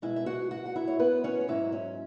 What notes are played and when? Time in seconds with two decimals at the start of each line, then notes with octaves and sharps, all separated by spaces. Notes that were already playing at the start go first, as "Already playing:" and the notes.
0.02 B2 G#3 E4 E5
0.16 E5
0.26 F#4 F#5
0.51 F#4 F#5
0.66 F#5
0.76 E4 E5
0.88 C#5
0.99 B3 B4
1.24 C#4 C#5
1.41 C#5
1.48 G#2 F#3 E4 E5
1.72 C#4